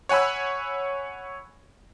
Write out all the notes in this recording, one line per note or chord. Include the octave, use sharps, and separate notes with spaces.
C#5 F#5 G#5 B5 E6